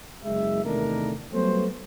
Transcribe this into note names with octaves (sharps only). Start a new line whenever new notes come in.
F#1 G#3 E5
E2 C3 D#3 A3 D4 A#4
F#3 G3 A3 B3 C#4 C5